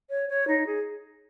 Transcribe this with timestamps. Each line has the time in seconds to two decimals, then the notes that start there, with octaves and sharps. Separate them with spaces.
0.10 C#5
0.29 C#5
0.48 D#4
0.66 G#4